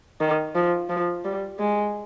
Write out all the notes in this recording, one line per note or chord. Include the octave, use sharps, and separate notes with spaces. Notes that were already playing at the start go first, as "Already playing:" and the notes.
D#3
F3
F3
G3
G#3